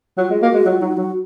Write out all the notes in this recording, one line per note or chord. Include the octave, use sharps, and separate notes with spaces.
F#3 F4
G#3
A#3 F#4
G#3
F#3 F4
F#3 D#4
F#3 F#4